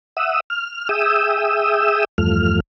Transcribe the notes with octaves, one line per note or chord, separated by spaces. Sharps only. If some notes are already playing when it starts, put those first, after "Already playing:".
E5 F#5 D#6 E6
F6
G#4 E5 G5 D#6 E6
E2 G2 F3 A3 F6